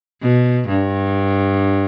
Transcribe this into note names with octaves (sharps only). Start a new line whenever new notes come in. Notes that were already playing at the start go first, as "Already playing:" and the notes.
B2
G2